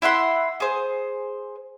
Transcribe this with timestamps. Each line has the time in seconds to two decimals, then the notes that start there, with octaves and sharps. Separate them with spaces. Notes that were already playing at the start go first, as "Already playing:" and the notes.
0.02 E4 E5 F#5 C6
0.60 G#4 C5